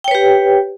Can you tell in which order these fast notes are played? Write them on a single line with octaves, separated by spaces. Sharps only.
G5 C#5 B4 G4